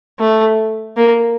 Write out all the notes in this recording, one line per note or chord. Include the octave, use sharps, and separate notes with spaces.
A3
A#3